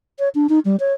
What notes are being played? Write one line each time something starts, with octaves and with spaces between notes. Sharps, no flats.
C#5
D4
D#4
G3
C#5